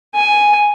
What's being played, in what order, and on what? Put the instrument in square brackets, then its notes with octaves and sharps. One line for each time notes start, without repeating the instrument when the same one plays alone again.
[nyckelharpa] G#5